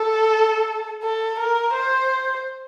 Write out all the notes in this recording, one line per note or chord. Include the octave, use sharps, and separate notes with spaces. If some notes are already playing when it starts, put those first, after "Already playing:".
Already playing: A4
A4
A#4
C5